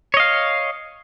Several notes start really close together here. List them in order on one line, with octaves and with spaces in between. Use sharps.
C#5 D#5 F5